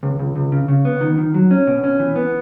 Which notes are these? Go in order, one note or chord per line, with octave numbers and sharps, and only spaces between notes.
C#2
C#2
C#2
C#3
C#3
B3
D#3
D#3
F#3
C#4
B2
C#4
E3
B3